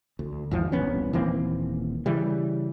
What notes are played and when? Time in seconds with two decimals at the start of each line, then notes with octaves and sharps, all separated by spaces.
0.19 D2
0.51 G#1 E2 F3
0.72 E1 C2 B3 C#4
1.13 D#1 E3 A#3 C4
2.06 C#3 E3 G3